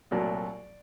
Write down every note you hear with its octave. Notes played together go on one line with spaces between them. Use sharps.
C2 A#2 F#3 A3 D5